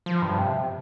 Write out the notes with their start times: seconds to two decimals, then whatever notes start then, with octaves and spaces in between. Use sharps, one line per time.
0.06 F3
0.22 G2
0.38 C3